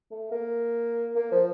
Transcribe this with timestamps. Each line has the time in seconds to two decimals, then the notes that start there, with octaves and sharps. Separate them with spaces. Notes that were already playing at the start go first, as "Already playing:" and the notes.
0.11 A3
0.32 A#3
1.16 A#3
1.32 F3